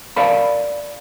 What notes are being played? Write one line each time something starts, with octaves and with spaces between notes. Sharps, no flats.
A#4 D5 E5 F5 A5 B5